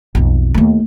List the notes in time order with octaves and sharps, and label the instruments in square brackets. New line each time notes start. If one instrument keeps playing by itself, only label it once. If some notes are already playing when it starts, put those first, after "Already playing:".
[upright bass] B1 F2
D#2 A3